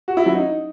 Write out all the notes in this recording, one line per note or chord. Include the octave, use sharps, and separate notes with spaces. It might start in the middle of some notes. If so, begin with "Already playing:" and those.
F#4
E4
F#3
D#4